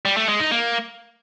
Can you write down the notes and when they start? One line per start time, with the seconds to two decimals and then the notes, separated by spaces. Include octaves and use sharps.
0.05 G3
0.17 A3
0.28 G#3
0.40 D#4
0.51 A#3